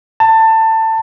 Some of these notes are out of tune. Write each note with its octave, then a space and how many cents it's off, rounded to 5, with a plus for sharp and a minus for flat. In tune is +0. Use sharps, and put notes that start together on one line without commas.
A5 +20